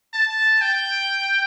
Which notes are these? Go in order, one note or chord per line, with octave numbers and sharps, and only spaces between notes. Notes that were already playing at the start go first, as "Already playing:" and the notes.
A5
G5